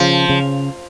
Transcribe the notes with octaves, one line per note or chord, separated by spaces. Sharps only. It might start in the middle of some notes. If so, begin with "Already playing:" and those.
Already playing: C#3 F3
C#3